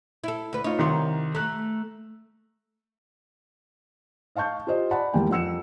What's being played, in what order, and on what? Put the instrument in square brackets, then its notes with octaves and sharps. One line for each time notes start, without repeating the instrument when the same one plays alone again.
[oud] E4 A4
D2 B4
[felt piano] D#4 F4 [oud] C#5
[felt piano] C2 D#3 C6
[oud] A3 [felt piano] A#5 F#6
[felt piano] D#5 F5 A5 C#6 G6
F4 G4 C5 D#5
D5 F#5 A5 B5
E2 G#2 G3 A#3 G5
F2 F#5 E6 C#7 E7